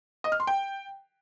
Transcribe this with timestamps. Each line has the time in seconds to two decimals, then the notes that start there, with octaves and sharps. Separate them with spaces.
0.24 D#5
0.32 F6
0.40 C6
0.47 G5